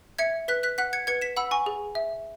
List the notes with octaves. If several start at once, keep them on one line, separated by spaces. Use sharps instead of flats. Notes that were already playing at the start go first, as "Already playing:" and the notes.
E5 G#6 C#7
B4 F#6 B6
F#6 B6
F#5 F#6 B6
G#6 C#7
B4 G#6 C#7
B6 E7
F#5 B5 E6
G#5 C#6
G#4
E5